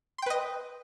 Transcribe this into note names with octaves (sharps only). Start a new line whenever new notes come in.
B4 D#5 G5 C6